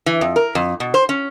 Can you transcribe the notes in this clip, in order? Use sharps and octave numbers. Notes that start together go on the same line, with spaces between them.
E3
F2
A#4
F2
B2
C5
C#4